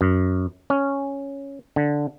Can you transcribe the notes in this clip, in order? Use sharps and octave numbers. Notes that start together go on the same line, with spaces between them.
F#2
C#4
D3